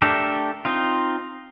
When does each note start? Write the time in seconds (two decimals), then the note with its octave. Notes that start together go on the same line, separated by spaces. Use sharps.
0.02 A3 D4 G4 A4 A#4
0.65 C4 D#4 F4